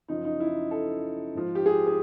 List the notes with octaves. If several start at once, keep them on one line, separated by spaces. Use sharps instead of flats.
F#2 C#3 F3 D#4
D#4
E4
A4
G#2 F3
G4
G#4
G#4